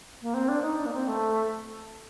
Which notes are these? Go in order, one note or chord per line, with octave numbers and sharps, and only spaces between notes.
A#3
C4
D4
D#4
D4
A#3
C4
A3